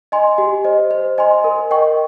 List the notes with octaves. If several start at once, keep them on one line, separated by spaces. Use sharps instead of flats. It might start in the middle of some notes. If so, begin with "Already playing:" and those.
D#5 G#5 C6
G4
C5 D#5
C5
D#5 G#5 C6
A#4
D#5 G5 C#6